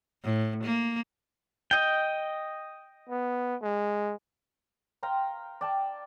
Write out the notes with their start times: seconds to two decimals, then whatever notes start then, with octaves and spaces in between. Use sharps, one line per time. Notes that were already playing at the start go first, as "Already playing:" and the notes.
0.24 A2
0.64 A#3
1.71 D#5 G5
3.09 B3
3.62 G#3
5.03 F5 G5 A#5 C6
5.61 D5 G5 A5